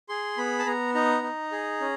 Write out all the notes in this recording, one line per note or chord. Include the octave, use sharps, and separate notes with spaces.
G#4 C6
B3 B5
A5
B3 A#5
D#4 A#5
D#4
G#4
C#4